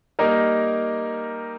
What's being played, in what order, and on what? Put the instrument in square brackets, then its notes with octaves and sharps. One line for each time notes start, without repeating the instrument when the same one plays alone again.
[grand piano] G3 A#3 D#4 A#4